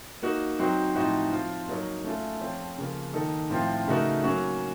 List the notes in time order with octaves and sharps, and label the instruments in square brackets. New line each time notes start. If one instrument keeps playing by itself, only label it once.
[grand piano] A#3 D#4 F#4
F#3 C4 D#4 F#4 C5
A2 F3 C4 D#4 F#4
F3 C4 F4
F#3 A#3 D#4 A#4 C#5
A3 C#4 F4 A4
F3 C4 F4 A4 C#5
C#3 F3 A#3
D#3 A#3 D#4 A4
A2 F3 C4 F4
C#3 A3 D#4 F#4 A#4
F#3 A#3 C#4 F#4